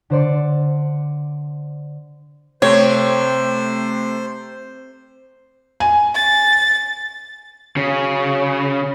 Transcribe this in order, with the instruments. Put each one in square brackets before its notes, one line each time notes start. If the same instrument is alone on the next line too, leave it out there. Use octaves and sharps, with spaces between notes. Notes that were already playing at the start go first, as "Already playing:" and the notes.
[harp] D3 C5 D5 C#7
[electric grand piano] C3 A3 [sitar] C4 [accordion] C5 [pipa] C#5
[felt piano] G#5
[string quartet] A6
[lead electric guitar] C#3 [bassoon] F#3